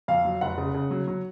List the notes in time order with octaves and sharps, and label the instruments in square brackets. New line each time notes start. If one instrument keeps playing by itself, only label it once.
[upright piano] F2 F5
F#3
F1 F#5
C#3
C#3
F#3
F#3